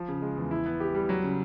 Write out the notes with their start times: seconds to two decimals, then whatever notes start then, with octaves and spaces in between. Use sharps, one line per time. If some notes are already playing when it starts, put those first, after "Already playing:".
Already playing: F3
0.08 C#3
0.22 G#3
0.37 E2
0.51 E4
0.66 B3
0.80 G4
0.95 G3
1.09 F#3
1.24 C#3